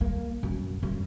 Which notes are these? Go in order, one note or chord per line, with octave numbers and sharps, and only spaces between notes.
A#3
F#2
F#2